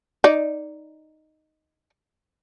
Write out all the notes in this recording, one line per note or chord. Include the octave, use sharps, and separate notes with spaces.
D#4 D5